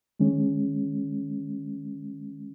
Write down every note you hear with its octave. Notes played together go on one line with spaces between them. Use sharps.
D#3 G#3 C#4